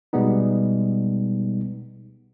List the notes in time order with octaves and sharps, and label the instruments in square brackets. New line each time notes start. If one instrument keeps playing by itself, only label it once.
[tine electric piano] B2 G3 G#3 B3 D#4